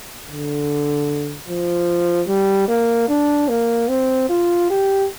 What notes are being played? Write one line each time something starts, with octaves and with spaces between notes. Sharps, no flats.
D3
F3
G3
A#3
D4
A#3
C4
F4
G4